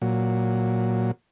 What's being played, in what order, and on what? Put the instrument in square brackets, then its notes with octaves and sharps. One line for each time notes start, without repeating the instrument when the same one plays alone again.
[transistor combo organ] A#2 F#3